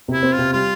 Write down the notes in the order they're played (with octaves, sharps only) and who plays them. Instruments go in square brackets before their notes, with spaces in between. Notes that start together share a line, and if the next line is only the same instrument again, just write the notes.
[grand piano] C3 [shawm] E4
[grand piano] C4
[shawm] F4
[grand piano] C3
[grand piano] G3 [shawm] F4